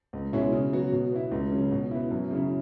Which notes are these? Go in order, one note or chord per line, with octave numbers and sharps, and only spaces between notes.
C#2
B2 G#3 C#4 E4
C#3
F#3 B3 F#4
B2
B3 E4
C#2
C#3 F#3
B2
B3 E4
F#2
C#3 F#3 E4